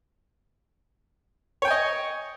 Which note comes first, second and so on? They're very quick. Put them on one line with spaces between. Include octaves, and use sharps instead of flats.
C#5 G5 G#5 D#5